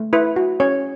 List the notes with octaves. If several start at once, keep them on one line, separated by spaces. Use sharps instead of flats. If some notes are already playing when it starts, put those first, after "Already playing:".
Already playing: A3
E4 B4
F#4
C#4 C#5